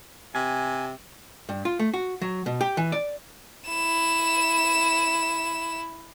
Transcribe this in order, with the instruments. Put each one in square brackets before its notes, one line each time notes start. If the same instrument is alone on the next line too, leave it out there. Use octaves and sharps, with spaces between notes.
[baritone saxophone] C3 [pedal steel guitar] G#5
[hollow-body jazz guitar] G2
F4
A3
F#4
F#3
B2
G4
E3
D5
[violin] E4 E7